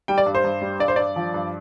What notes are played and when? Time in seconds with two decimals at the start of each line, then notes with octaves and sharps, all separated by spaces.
0.08 G3 G5
0.18 D5
0.26 G2
0.35 C5
0.44 G2
0.62 G3
0.80 G2 D5
0.88 C5
0.96 G2 D5
1.16 F3
1.34 G2